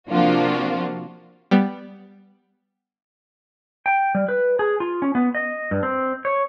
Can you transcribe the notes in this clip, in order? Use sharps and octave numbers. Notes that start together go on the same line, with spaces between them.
C3 F3 A#3 D4 F4 F#4
G3 B3
G5
G3
B4
G#4
F4
C#4
B3
D#5
G2
C4
C#5